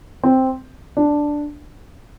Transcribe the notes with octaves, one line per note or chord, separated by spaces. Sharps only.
C4
D4